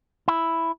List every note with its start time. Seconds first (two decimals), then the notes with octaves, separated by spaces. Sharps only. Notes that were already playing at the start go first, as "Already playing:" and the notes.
0.28 E4